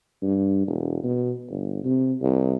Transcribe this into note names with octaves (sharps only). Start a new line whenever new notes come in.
G2
E1
B2
G1
C3
C2